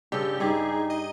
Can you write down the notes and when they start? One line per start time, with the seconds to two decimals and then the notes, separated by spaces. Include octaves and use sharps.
0.12 G2 C#3 G4 A4
0.40 G2 D#4 G4 G#4
0.90 D#5